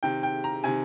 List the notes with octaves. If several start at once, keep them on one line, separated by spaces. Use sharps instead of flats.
C3 D#3 G5
G5
A#5
C3 D#3 G#5